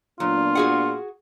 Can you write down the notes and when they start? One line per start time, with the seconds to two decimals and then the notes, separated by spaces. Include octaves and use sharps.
0.20 A#2 F#3 B3 D4 F4
0.55 F#4 G#4 F#5